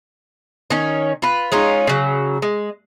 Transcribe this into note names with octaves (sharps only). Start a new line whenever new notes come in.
D#3 C#4
F4 B4
G#3 C#4 D#4 F4
C#3 F#3
G#3